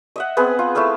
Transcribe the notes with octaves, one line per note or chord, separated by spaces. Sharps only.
D#5 E5 F#5
B3 C4 G#4 B4
F4
A3 E4 F5 E6